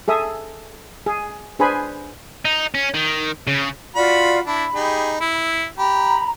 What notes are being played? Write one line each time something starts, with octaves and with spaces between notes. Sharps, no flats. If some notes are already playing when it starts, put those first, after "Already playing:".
G#4 A4 E5 D#6
G#4
D4 G#4 B4 C5 G#5 B5
D#4
C#4
D#3
C#3
F4 F#4 D5 B5
D4 E4 B5
D#4 G4 G#4
E4
G4 A#5 B5